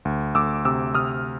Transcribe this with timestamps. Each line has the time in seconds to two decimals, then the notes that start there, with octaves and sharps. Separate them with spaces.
0.05 D2
0.35 D2 D6 E6
0.65 C3 D6 E6
0.95 C3 D#6 F6